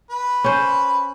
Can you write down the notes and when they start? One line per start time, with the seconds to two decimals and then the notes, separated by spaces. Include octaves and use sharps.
0.10 B4
0.44 C#4 C5